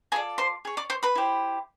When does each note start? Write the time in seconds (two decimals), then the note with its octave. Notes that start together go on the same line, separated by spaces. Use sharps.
0.12 F4 G#4 A4 D5 G#5
0.38 C5 C6
0.65 G#4 C#5
0.77 D5 D6
0.90 C5 C6
1.03 B4 B5
1.15 E4 G4 C5